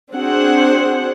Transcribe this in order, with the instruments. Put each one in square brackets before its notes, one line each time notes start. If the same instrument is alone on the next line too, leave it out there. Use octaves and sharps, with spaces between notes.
[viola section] C4 D4 F#4 G#4 C5 F#5